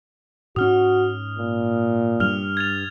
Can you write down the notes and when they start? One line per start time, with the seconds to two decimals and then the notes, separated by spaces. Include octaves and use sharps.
0.56 G#2 C#4 F#4 D#6 F6
1.38 A#2
2.20 G2 G3 F6 F7
2.57 G#6 A6 F7